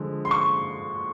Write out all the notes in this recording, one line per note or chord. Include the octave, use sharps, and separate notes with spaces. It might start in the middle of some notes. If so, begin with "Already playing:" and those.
Already playing: D3 F3 G#3
C6
C#6